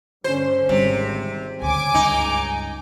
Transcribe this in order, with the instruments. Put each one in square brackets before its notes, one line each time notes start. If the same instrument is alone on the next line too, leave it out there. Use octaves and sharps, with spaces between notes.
[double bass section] G2 D3 C#4 [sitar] C5
[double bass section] G#1 [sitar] C3 [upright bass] G3
[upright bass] D2 [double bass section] C#3 [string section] G#5 D6
[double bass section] C#2 [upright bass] G2 [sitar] D#4